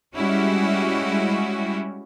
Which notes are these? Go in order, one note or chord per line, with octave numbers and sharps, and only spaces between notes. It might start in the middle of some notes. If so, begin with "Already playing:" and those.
G3 G#3 C#4 E4 F#4 G4